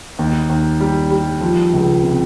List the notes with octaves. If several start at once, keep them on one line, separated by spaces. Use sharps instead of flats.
D#2
D#2
G3
G3
F3
C#2
C3